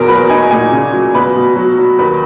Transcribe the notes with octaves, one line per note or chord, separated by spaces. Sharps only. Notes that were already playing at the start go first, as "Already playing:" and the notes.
Already playing: F#1 E2 B2 A#4
F#3 B4
D#4 G#5
A#2 G#5
C#3
F#3
B2 B4
B2
F#3
F#3
D#2 B4